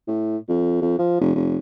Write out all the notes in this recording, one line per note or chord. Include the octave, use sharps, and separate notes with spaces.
A2
F2
F2
F3
F1
F1